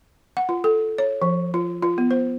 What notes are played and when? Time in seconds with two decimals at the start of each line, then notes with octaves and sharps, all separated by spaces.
0.37 F#5
0.49 F4
0.64 A4
0.98 C#5
1.22 F3
1.54 F4
1.82 F4
1.98 B3
2.11 C5